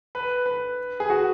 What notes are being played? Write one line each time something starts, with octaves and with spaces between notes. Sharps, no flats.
B4
B4
G#4
F#4